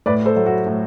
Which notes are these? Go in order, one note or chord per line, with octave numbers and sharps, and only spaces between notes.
A2 B4 D5
A4 C5
F#3 A3
F#4
A2